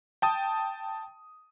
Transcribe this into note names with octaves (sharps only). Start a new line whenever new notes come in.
G5 A5 D#6